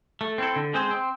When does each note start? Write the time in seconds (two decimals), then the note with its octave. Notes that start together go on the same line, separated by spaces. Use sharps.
0.21 A3
0.38 C4 E4 A4
0.56 D3
0.74 G#3 C4 G#4 C5
0.91 C4